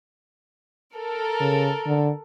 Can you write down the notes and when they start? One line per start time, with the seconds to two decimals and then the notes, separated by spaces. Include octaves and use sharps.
0.95 A4 A#4
1.40 C#3
1.86 D3